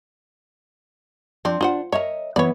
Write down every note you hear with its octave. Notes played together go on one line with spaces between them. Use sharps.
F3 C4 D4
D4 F4 C5 F#5
A#4 C#5 D#5 E5
E3 B3 C#5 D5